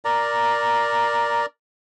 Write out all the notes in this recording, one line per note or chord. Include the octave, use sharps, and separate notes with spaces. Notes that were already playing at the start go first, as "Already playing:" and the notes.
A#4 D5 A#5